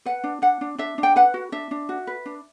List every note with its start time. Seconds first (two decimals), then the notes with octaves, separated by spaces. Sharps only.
0.05 B4 F#5
0.24 D4
0.42 D4 F#5
0.61 D4
0.79 D4 E5
0.98 D4
1.03 G5
1.16 B4 F#5
1.34 F#4
1.52 D4 E5
1.71 D4
1.89 F#4
2.07 B4
2.26 D4